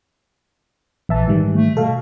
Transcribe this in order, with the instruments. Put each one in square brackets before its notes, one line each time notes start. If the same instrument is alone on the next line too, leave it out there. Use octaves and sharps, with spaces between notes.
[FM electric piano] A#1 E5 A5 [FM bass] E3
[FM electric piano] G#2 D#3 G3
[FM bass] A3
[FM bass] B2 [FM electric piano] A4 F5